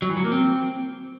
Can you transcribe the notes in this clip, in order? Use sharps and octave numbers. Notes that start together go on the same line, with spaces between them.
F#3
E3
F#3
A#3
C4